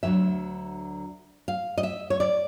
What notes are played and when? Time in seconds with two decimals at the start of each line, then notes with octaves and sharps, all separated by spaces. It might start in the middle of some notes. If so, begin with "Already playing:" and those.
0.03 D2 D3 F#3 A3 E5
1.48 F5
1.78 D#5
1.83 E5
2.10 C#5
2.20 D5